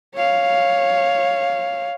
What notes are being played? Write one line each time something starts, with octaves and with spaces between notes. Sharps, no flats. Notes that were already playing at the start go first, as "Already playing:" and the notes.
C#5 F5